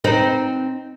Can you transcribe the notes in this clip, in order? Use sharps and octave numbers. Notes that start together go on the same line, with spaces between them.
C4 D#4 B4